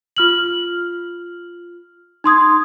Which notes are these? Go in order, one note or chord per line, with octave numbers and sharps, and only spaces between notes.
F4 F6 F#7
D#4 C6 D#6 G#6